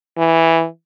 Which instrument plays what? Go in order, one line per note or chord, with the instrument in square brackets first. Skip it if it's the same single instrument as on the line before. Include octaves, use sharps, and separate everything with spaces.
[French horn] E3